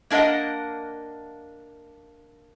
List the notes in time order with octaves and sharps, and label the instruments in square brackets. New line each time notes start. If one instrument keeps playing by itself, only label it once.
[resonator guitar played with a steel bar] A#3 D4 A#4 D#5 F#5